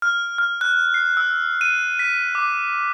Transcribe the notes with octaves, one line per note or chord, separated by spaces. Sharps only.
F6
F6
F#6
C7
E6
D#7
B6
D6